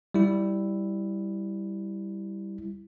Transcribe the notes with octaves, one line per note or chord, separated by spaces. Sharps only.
G3 E4